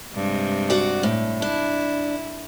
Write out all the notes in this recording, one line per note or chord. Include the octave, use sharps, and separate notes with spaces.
G2 C3 G#3
F#4 D5
A2
D4 E4